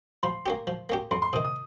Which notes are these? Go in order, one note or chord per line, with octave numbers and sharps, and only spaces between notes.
F3 C6
A#3 C#4 G4
F3
A#3 C#4 G4
F2 C6
C6
C3 D#3 D#6
D#6